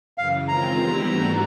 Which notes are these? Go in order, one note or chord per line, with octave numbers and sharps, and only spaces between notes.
F#2 C#3 E3 F5
D#3 G#3 C4 F4 A#5
E3 G3 B3 E4 G4
G#2 E3 A3 D4 F#4